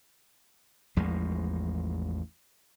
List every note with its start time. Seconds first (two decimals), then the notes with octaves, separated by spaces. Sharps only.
0.96 A1 E2 F3 G#3